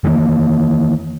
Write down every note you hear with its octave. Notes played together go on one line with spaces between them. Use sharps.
D#3 E3 G3 A#3